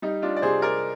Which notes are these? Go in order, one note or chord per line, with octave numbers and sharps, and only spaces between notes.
G3 D#4
D4 F4
D5
C3 G#4 C5
A#4 D5